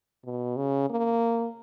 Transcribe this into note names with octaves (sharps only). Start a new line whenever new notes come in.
B2
C#3
A#3